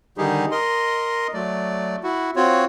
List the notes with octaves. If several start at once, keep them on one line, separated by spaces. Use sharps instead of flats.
D3 D#3 G3 D#4 G4 G#4
A#4 D#5 C6
F#3 A3 D5
E4 F#4
C4 F4 F#4 C#5